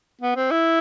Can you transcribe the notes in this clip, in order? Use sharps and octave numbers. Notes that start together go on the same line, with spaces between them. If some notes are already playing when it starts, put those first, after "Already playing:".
B3
C4
E4